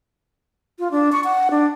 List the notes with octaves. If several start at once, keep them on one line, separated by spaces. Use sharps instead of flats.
F4
D4
C#6
F#5
D4